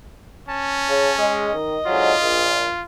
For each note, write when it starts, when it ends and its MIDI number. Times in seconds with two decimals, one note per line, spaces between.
0.48 1.55 61
0.48 1.16 81
0.88 1.09 49
1.18 1.48 56
1.18 2.70 75
1.53 1.76 51
1.86 2.11 44
1.86 2.11 50
1.86 2.11 54
1.86 2.84 65
2.21 2.67 34